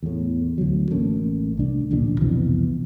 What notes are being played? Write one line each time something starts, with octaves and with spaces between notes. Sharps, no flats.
E2 A2
D2 F#3
A1 A3 A#3 C#4
C2 D4
D1 A1 A#2 D4
C2 F2 B2 E3